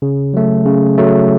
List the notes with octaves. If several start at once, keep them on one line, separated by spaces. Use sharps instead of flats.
C#3
F#3 A3
C#3
F#3 A3